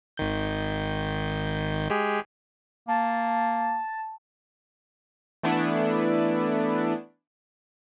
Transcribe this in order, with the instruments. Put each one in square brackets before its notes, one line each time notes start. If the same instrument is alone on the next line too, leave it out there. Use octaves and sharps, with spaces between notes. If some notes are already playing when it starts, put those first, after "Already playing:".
[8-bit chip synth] G#1 D#3 G6
G#3 G4 G#4
[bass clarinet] A#3 [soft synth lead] A5
[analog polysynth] E3 A3 B3 D4 E4